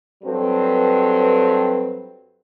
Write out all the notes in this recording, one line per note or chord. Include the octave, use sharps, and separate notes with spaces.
G2 F#3 C4 A4 B4